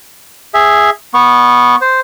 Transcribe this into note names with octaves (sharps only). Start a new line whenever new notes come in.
G#4 E5
B3 C#6
C5